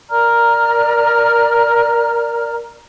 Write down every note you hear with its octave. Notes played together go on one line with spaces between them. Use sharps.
A#4 D5 A#5 F6